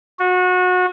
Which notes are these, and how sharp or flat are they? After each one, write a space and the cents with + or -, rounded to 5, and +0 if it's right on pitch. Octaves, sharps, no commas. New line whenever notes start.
F#4 -25